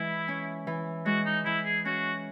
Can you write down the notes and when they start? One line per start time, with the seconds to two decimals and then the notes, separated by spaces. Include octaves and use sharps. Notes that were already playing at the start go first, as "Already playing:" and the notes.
Already playing: E3 G#3 E4
0.28 C#4
0.67 E3
1.06 G#3 F#4
1.25 D#4
1.45 E3 E4
1.65 G#4
1.85 C#4 F#4